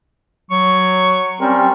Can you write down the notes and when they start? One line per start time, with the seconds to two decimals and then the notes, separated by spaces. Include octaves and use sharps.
0.51 F#3 C#6
1.40 G3 C4 C#4 A#4